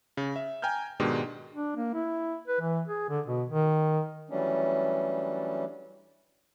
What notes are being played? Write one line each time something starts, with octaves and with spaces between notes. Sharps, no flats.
C#3
E5
G5 G#5 A#5 F6 G6
G#2 B2 D#3 G#3 D4 G4
D4
A#3
E4
B4
E3
G#4
D3
B2
D#3
E3 F#3 G3 A3 C#4 D4